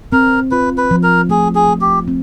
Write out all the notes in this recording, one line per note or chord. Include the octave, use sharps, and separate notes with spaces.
C4 A#4
F4 B4
B4
F3
A#4
A3 G#4
G#4
A3
G4
C4